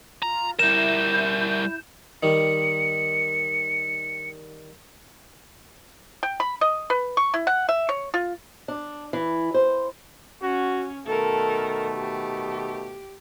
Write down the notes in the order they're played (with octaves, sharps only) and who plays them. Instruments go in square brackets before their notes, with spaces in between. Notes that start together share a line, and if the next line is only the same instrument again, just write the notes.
[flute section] F4 [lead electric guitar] A#5
[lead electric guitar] G3 A#4 [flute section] E4 G6 [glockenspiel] E7
[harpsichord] D#3 G3 [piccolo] C#7
[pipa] G5
B5
D#5
B4
C#6
E4
F#5
E5
C#5
F4
[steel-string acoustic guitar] D4
E3
C5
[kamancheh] C#4 [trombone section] F#4
[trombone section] B2 D#3 A3 [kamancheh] A4 A#4
[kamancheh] G4